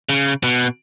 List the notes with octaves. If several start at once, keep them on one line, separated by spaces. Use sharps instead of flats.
C#3
B2